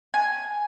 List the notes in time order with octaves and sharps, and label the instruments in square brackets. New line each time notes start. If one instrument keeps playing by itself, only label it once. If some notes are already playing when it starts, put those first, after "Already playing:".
[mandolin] G#5